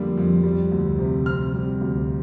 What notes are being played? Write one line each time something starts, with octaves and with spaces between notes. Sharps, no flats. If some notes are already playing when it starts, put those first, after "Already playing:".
Already playing: F2 D3 G3 A#3
F2
G3
D2
C3
C4 F6
G3
D2